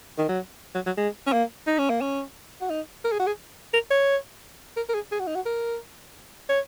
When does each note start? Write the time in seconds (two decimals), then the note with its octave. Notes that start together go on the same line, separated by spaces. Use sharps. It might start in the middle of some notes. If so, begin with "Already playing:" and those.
0.18 D#3
0.29 F#3
0.75 F#3
0.86 F#3
0.97 G#3
1.27 C#4
1.33 A#3
1.67 D#4
1.78 C#4
1.90 A#3
2.01 C#4
2.61 F#4
2.70 D#4
3.05 A#4
3.12 G#4
3.19 F#4
3.27 G#4
3.73 A#4
3.91 C#5
4.76 A#4
4.89 A#4
4.94 G#4
5.12 G#4
5.20 F#4
5.27 D#4
5.35 F#4
5.46 A#4
6.49 C#5